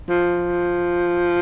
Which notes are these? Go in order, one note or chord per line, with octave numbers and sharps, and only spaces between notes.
F3